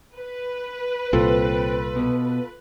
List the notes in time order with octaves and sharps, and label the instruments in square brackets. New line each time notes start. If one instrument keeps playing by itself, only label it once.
[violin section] B4
[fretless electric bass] C2 A#2 [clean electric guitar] C4 [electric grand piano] F4 A4
[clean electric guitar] B2